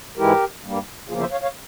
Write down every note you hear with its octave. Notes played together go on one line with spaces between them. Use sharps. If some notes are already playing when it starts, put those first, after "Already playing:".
G#2 E3 G#3 E4 G4 A#4
G2 G3 A#3
E2 C#3 F3 A#3 F4 G#4
C5 E5
C#5 F5
C#5 F5